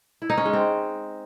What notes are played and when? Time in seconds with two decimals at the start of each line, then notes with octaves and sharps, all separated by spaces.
0.22 E4
0.30 D#4
0.38 C#4
0.45 G#3
0.53 C4